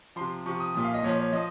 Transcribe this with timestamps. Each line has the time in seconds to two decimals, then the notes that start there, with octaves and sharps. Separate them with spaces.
0.16 C3 F3 C6
0.46 C3 F3 C#6
0.60 D#6
0.74 A#2 F3 D#6
0.84 F5
0.94 D#5
1.03 A#2 F3 C#5
1.19 C#5
1.33 F3 D#5